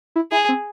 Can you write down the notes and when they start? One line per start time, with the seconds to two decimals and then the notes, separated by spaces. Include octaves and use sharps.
0.16 E4
0.32 E4 G#4
0.49 C4